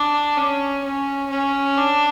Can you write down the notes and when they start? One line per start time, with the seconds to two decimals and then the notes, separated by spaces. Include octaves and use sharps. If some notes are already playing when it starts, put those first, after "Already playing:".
Already playing: D4
0.37 C#4
0.84 C#4
1.30 C#4
1.77 D4